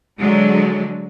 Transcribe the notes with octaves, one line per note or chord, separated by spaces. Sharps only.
D3 F#3 G#3